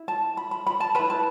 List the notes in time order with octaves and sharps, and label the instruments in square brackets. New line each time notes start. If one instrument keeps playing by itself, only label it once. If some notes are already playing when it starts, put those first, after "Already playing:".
Already playing: [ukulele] E4
A5
B5
B5
B5
A5
B4 B5
E4
A5